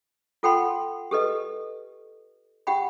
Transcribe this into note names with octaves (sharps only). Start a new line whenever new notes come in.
F4 A4 F#5 G5 B5 C6
G4 A4 B4 D#5
G4 F#5 G5 B5